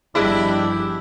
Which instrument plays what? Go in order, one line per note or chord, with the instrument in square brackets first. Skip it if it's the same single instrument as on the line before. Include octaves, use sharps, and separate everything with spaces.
[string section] G1 F3 G4 [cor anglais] D4 [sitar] E4 [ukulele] G#4 B4 D#5